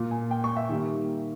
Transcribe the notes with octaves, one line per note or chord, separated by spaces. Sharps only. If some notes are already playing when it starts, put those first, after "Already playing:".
Already playing: A#2 A#3
G#5
G5
C#6
E5
D#3 G3 A#3